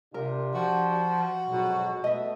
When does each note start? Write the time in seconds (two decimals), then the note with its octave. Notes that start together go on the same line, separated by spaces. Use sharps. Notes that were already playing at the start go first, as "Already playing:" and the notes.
0.14 C3 D4 F4 G4 A#4
0.54 F3 F#4
0.91 F#4
1.47 F2 G#2 B2 F#3
2.04 B2 A3 D#5 E5